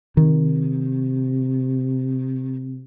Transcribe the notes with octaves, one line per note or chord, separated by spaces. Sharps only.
C3 D#3